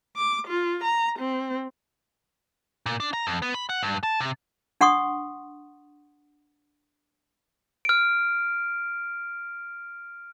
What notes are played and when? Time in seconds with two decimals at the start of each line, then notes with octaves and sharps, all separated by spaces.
0.17 D6
0.48 F4
0.84 A#5
1.19 C4
2.86 A#2
3.00 D4
3.13 A#5
3.27 F2
3.42 B3
3.54 B5
3.69 F#5
3.83 G2
4.03 A5
4.21 C3
4.81 D4 F#5 C6 C#6 D#6
7.85 F6 D7